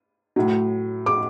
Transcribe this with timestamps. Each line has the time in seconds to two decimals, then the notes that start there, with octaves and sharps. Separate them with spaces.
0.36 A2 F#3
1.06 D6